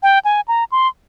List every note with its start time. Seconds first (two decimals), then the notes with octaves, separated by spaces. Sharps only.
0.03 G5
0.25 G#5
0.48 A#5
0.72 C6